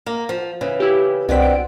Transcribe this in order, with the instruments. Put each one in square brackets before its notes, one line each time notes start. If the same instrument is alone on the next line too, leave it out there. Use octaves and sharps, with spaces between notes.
[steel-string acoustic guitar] A#3
F3
C#3 E3
[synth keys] E4 G4
[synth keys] C2 B6 [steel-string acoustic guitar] B2 D3 C4
[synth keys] D7